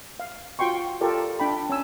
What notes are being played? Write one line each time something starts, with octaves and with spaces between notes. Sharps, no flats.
F5
F4 F#4 G5 C6 C#6
F4 G4 A4 A#4 D5
D4 G5 B5
C#4 G#5 E6